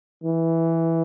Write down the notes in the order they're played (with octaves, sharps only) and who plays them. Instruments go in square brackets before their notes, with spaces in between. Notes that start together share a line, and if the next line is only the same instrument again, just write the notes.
[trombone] E3